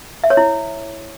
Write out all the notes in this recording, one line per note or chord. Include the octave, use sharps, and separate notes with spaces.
E5
C#5
E4